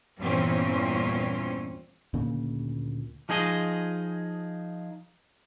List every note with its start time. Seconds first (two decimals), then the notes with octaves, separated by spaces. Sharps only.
0.19 E2 G2 A#2 E3 C4 C#4
2.13 D2 A#2 C#3 A#3
3.29 F3 D#4 G#4 D#5